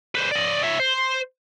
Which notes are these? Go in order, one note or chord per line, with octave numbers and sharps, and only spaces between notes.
B4 C5
D5 D#5
C#5 E5
C5